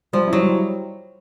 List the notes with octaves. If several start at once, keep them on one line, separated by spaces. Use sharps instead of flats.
F3 G3
F#3 E4
G3